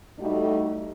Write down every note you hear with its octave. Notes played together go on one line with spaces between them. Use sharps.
A2 G3 A3 D#4 F#4